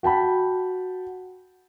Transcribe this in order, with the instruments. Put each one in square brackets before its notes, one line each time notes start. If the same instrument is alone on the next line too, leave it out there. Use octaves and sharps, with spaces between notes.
[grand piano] F#4 G5 A5 B5